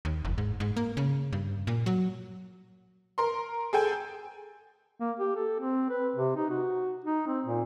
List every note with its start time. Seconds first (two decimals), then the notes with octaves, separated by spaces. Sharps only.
0.05 D#2
0.25 F#1
0.38 G#2
0.60 G#2
0.77 A#3
0.97 C#3
1.33 G2
1.67 A#2
1.86 F#3
3.18 A#4 C6
3.73 G#4 A4 G5 G#5
5.00 A#3
5.19 G4
5.36 A4
5.60 C4
5.90 B4
6.16 C3
6.36 D#4
6.50 F#4
7.04 D#4
7.27 C4
7.46 A#2